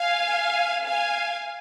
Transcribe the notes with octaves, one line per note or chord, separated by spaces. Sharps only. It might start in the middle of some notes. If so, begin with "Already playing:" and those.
Already playing: F5 G#5
F5 G#5